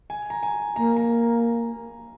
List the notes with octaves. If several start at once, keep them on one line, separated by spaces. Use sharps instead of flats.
G#5
A#5
G#5
A#3 A#5
A#5